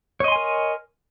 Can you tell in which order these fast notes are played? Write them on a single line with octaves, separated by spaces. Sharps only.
C#5 D#5 C6 G#5 A#4